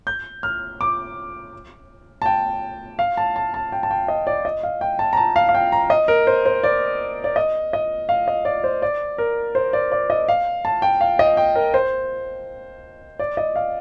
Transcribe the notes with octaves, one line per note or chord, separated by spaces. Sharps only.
G6
F6
D6
A5
G5
F5
A5
A5
A5
G5
A5
G5
D#5
D5
D#5
F5
G5
A5
A#5
A5
F5
F5
G5
A#5
D#5
A#4
C5
C5
D5
D5
D#5
D#5
F5
D#5
D5
C5
D5
A#4
C5
D5
D5
D#5
F5
A5
G5
F5
D#5
G5
A#4
C5
D5
D#5
F5